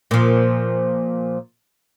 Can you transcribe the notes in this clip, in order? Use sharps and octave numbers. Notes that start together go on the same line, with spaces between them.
A#2 F3